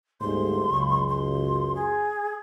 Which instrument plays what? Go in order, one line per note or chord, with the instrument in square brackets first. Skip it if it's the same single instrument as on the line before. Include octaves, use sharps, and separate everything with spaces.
[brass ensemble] G1 D2 G#2 [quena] C6
[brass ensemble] C#2 F#2
[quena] C6
G#4